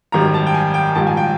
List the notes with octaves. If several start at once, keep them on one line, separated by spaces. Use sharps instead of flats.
G#1 F#2 D#3 G3 A#5
A5
G5
G#5
G5
A#1 G#2 D#3 G3 A5
G#5
G5